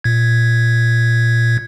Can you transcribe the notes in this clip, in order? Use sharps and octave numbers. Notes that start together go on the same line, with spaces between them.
A#2 G#6